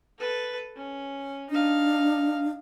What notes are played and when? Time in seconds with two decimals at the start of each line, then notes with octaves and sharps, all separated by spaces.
0.18 A4 B4
0.76 C#4
1.50 D4 D#4 F5